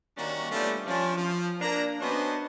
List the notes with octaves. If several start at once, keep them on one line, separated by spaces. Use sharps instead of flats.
D#3 G3 A#3 C#4 D4 F#4
G3 A3 B3 C#4 D4 F4
F3 C#4 D4
F3
A#3 D4 A#5
B3 C#4 D4 F#4 C5 D#5